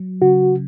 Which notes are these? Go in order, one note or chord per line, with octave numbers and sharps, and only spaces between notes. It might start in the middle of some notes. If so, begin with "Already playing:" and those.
Already playing: F#3
C#3 F#4